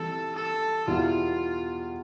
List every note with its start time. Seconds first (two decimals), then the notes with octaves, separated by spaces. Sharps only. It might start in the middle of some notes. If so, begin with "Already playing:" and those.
Already playing: E3 G3 C4 A4
0.36 A4
0.87 E2 B2 G3 B3 E4 F4